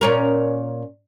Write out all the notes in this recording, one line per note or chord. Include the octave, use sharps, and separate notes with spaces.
A#2 C#4 A#4